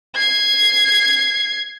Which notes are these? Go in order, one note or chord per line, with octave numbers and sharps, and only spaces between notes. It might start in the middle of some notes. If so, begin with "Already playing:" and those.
G#6 C7